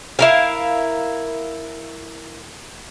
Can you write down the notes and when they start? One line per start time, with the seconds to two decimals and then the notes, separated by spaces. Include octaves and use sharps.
0.19 E4 A#4 F5